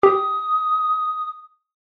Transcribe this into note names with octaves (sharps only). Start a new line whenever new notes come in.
G4 D#6